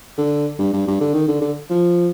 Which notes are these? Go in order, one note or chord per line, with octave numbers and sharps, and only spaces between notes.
D3
G2
G2
G2
D3
D#3
D3
D3
F3